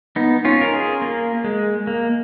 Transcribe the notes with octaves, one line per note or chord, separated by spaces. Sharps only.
B3 D#4
C#4 F4
A#4
F4 G#4
A#3
G#3
A#3